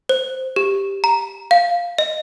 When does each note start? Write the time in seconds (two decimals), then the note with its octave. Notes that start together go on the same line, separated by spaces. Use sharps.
0.09 C5
0.56 G4
1.04 A#5
1.51 F5
1.98 D#5